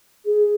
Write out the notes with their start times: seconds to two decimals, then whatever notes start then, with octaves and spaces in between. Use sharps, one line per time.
0.25 G#4